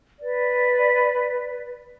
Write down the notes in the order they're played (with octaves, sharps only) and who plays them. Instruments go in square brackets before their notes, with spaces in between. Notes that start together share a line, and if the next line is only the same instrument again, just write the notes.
[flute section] B4 D5